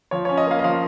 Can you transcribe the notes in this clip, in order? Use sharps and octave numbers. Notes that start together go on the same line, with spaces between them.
F3 C#5
C#5
C#4
D#5
A#3 F5
D#5
F3 F5